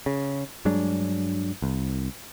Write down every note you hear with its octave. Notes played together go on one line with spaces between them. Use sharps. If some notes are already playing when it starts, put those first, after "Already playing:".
C#3
G2 F#3 G#3 D4
C2